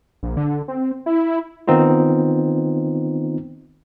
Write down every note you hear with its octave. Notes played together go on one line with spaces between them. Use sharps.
A#1
D3
C4
E4
D#3 B3 C4 D#4 F4